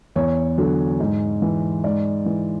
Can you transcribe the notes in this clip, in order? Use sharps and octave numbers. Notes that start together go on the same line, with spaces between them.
E2 C#5
D3 F#3
G#2
E3
G#2 D5
E3